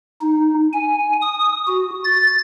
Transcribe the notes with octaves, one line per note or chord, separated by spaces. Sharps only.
D#4
G#5
D#6
F#4
A6